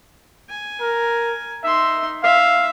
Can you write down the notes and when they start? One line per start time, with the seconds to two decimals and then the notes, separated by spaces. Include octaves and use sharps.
0.50 G#5
0.80 A#4
1.64 D#4 E5 C6
2.23 E5 F5